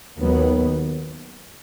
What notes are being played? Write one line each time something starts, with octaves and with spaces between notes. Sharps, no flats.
D#2 D#3 F#3 B3